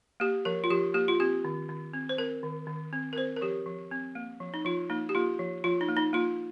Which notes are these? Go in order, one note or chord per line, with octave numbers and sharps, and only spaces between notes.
A#3 G4
F3 A#4
F4
F3 G4
A#3 G4
F4
C4 G4
D#3
D#3
C4
C5
C4 A#4
D#3
D#3
C4
A#4
C4 C5
A#4
F3 G4
F3
C4
A#3
F3
D#4
F3 F4
A#3 D#4
G4
A#3 F4
F3
F3 F4
D#4
A#3
D#4
A#3 F4